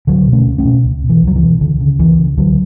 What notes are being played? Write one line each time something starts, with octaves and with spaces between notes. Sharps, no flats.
C#2 D3 F#3
B2
A3 C#4
C#2
A3 C#4
B2
C#2
B2
E3
C#2 F#3
E3
B2
C#2 D3
C#3
C#2 E3
C#3
C#2 D3 F#3